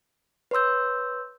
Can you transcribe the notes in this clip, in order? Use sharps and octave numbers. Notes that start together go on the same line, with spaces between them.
B4 C#5 C6 E6 G6